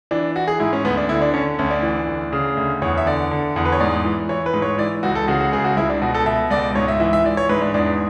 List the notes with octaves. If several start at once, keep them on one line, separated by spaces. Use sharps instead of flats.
E3 D4
E3 F#4
G#4
G#2 E4
C#4
D2 B3
D4
D3 E4
D4
D3 C#4
D2 C#4
D4
E3
D2
C#3
D2
E2 C#5
E5
D3 D5
D3
E2
B4
C#5
G#2 D5
E3
E3 C#5
B4
G#2
C#5
E3 D5
C#2 F#4
A4
C#3 F#4
F#4
C#2 G#4
F#4
C#2 E4
D4
B2 F#4
A4
B2 E5
C#2 D5
G#2 C#5
E5
E3 E5
E5
E3 D5
C#5
G#2 B4
D4
E2 D4